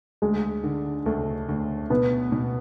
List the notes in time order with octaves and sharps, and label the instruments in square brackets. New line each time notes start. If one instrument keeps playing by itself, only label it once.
[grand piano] D2 [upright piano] G#3
[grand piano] D3
[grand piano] D2 [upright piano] A3
[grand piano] D2
[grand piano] B2 [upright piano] B3
[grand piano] B2